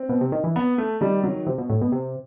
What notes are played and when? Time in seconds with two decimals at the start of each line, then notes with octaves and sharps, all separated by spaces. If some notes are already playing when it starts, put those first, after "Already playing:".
Already playing: C4
0.09 B2
0.21 C3
0.32 D#3
0.44 E3
0.56 B3
0.78 A3
1.01 D#3 G3
1.23 F#3
1.47 C3
1.58 B2
1.70 A2
1.82 B2
1.92 C3